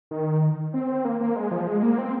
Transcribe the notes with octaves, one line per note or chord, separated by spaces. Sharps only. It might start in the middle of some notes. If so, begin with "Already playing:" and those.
D#3
C4
A#3
A#3
G#3
F3
G#3
A#3
C4